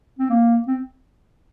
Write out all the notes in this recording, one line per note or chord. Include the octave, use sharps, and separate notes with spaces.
C4
A#3
C4